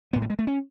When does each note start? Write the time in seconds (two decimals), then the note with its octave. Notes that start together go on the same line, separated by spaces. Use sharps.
0.13 A1 A2 B3
0.22 A3
0.30 G#3
0.39 A3
0.47 C#4